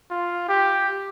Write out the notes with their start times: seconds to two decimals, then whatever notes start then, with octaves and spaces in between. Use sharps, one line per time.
0.10 F4
0.49 G4